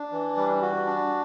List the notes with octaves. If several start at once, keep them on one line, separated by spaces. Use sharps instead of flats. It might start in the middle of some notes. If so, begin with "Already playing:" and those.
Already playing: D4
E3
G3
F#4
D4